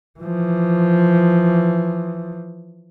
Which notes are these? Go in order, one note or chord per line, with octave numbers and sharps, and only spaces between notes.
E3 F3